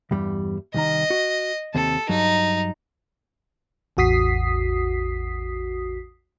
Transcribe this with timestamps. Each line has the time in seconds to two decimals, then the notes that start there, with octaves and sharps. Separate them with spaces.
0.11 E2 G2 G3
0.74 C2 D#3 D#5 A#5
1.10 F#4
1.75 D#2 C3 C4 A4
2.09 G2 F#3 D#4
3.97 A1 E2 F#4 D#6 B6 C7